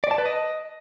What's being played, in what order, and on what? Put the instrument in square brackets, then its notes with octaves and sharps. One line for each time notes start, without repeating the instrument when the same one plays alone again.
[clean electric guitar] D5
A5
B4
D#5